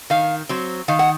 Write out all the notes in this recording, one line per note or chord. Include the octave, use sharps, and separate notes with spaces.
D#3 F5
F#3 C4
D#3 F5
F#5